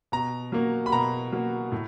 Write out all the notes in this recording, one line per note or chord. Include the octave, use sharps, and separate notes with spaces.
B2 A#5
F#3 A#3
B5
B2 A#5
F#3 A#3
A2